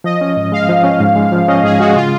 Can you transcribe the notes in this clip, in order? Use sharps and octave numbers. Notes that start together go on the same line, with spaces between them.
F3 D#5
C#4 D#5
G#2
G#3 F5
F3
C#4
G#2
G#3
F3
C#4 D#5
G#2 G#4
G#3 F#4
C#3 F4